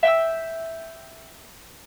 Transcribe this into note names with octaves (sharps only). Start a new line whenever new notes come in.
E5 G5 E6